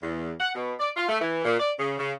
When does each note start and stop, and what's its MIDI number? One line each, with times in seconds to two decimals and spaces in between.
0.02 0.32 40
0.39 0.51 78
0.55 0.73 47
0.80 0.90 74
0.96 1.08 65
1.09 1.20 57
1.21 1.40 52
1.44 1.55 46
1.60 1.72 74
1.79 1.94 49
1.98 2.12 49